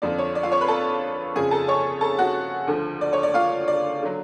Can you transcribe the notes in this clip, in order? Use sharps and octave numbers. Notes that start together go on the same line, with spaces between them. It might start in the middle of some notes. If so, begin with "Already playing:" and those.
F2 D3 F3 D5
C#5
D5
F4 F5
C#5 C#6
B4 B5
A4 A5
F2 C#3 F3 G#4 G#5
A4 A5
C#5 C#6
A4 A5
F#4 F#5
D2 D3 F3
D5
C#5
D5
F4 F5
D5
D3 F#3